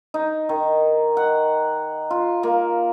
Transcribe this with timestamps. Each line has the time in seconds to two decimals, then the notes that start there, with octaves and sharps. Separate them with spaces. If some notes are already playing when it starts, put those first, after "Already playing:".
0.14 D#4
0.49 D#3
1.17 F#5
2.11 F4
2.43 A#3